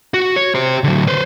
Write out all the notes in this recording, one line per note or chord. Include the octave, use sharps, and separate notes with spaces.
F#4
C#5
G4 C5
D3 F#3
B4 C5